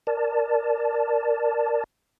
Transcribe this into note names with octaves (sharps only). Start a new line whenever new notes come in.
A#4 D5 A5